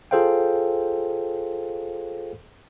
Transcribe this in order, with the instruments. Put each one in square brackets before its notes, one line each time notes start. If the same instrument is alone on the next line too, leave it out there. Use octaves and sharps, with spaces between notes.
[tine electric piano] F4 G#4 A4 C5 F5 G5